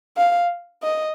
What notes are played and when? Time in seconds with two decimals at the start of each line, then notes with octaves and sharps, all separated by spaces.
0.17 F5
0.83 D#5